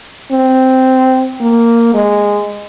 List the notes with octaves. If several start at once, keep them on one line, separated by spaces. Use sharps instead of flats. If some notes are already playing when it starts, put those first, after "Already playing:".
C4
A#3
G#3